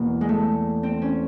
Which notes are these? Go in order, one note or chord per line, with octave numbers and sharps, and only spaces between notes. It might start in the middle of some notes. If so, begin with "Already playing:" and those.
Already playing: E2 B2 A#3
G#3
A3
C4
C#4